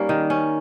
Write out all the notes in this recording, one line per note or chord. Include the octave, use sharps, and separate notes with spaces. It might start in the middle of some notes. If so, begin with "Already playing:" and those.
Already playing: G3 A#3 C#4 D#4
D#3
C#4